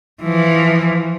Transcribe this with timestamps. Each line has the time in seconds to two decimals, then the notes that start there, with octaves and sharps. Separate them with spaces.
0.22 E3 F3